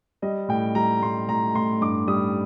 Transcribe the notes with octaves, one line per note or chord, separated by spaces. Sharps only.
G3 D#5
A2 G5
G3 A#5
A2 C6
A2 A#5
A2 C6
G2 D6
G3 D#6